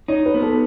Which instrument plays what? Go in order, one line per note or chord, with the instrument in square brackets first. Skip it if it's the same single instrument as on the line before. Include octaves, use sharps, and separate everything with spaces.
[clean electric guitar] D#4 [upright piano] C#5
[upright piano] B4
[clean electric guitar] B3
[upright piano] A4